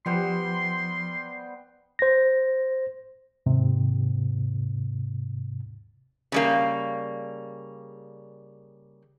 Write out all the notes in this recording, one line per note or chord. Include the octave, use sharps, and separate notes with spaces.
F3 G3 B3 C5 C6
C5 A#6
D#2 G#2 C3
C#3 G3 A#3